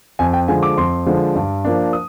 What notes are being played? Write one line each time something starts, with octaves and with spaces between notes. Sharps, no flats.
F2 G#5
G5
D3 F3 G#3 G#5
D6
F2 C6
D3 F3 G#3
G2
F3 A#3 D4
D#6